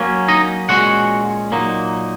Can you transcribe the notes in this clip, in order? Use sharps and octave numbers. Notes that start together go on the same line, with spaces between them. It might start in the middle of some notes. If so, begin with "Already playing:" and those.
Already playing: F#3 A#3 C#4
D#4 D#5
A#2 G#3 C#4 F#4 F#5
A#2 F#3 A#3 D#4